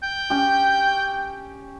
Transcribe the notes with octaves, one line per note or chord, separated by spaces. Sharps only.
G5
C#4 G4